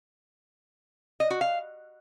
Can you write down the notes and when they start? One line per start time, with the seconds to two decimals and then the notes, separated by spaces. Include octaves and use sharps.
1.20 D#5
1.30 F#4
1.41 F5